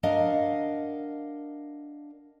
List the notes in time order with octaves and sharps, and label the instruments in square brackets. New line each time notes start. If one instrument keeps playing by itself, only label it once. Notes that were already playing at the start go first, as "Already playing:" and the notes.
[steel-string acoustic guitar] D4 A#4 D#5 F5 F#5